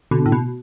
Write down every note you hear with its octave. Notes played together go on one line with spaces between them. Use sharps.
B2 D3
A2
B2